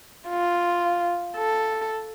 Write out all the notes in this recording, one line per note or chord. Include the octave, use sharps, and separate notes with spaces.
F4
A4